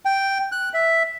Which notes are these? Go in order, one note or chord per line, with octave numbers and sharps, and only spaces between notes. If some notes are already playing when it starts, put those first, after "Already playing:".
G5
F#6
E5